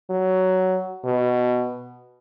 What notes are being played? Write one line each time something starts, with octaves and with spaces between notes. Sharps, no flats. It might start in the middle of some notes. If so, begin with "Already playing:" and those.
F#3
B2